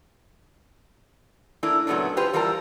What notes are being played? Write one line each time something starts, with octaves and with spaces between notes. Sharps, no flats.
A3 A#3 D4 E4
A#2 C#3 F#3 A3 B3 D4
F4 G4 B4 C5
E3 G3 F4 A#4 A5